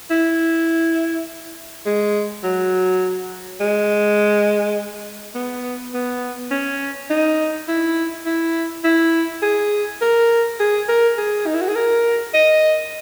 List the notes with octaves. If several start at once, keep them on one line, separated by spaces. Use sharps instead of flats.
E4
G#3
F#3
G#3
B3
B3
C#4
D#4
E4
E4
E4
G#4
A#4
G#4
A#4
G#4
D#4
E4
F#4
G#4
A#4
D#5